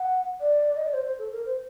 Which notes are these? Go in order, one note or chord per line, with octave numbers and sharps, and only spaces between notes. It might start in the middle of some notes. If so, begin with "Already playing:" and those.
Already playing: F#5
D5
D#5
D5
C5
C5
A4
A#4
C5